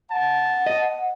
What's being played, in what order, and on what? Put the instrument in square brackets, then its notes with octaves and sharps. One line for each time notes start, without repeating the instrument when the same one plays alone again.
[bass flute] F#5 [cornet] A5
[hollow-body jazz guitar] D#5